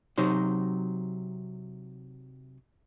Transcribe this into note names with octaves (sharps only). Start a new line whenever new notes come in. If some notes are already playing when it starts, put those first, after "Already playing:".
C3 F#3 D#4 C5